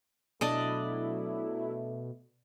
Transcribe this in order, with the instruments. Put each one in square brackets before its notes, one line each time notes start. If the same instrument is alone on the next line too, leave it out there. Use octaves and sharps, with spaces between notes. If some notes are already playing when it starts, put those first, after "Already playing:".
[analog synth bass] B2 [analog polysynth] F#3 E4 [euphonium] A3 [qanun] D4 D5 D#5